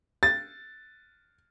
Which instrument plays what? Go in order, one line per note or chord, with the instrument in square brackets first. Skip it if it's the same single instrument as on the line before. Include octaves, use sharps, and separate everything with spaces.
[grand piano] A6